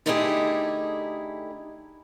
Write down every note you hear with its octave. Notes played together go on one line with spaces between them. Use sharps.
D3 A3 D#4 E4 G4 G#4